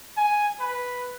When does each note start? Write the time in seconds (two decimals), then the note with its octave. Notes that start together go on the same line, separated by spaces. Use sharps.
0.17 G#5
0.60 B4